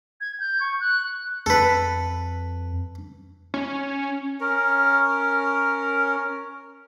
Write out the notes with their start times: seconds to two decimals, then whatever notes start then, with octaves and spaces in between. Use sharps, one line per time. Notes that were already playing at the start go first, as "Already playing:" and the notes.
0.21 G#6
0.40 G6
0.60 C#6
0.80 F#6
1.46 F2 A4 B4
3.54 C#4
4.41 C#4 A#4